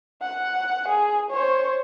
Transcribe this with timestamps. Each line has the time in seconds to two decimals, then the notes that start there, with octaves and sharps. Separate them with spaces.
0.22 F#5
0.88 G#4
1.30 C5 C#5